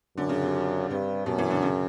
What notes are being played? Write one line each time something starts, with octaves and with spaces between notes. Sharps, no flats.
F#2 D3
C#3
C3
G2 C3
F#2 B2
E3
D3
C#3